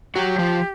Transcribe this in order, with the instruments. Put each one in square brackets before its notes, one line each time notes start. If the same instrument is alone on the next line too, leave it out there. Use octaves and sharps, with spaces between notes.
[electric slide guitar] F#3 F#4 [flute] G4
[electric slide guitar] F3 F4